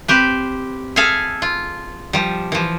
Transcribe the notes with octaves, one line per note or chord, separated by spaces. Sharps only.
C4 G4 B4
G#4 A4 E5 F5 G#5
F4
F3 G3
E3 F3